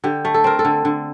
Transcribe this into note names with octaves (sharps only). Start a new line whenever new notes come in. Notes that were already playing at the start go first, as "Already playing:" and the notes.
D3 G4
A3
A4
C4 A#4
A4
D3
D3